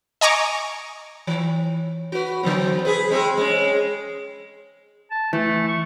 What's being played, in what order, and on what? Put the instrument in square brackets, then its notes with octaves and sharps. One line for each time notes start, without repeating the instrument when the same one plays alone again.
[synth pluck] D#5 G#5 A#5 C#6 D6
[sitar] E3
F#4 B4
D3 F#3 C4
G#4 B4
G#3 C4 G#4
G#3 C#4
[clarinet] A5
[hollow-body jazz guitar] E3 [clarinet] A3
[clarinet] C#6